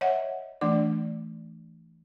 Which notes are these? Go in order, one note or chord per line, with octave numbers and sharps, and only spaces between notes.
C#5 D#5 E5 F#5
E3 A3 D4 D5